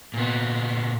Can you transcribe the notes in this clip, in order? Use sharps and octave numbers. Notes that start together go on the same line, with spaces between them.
A#2 B3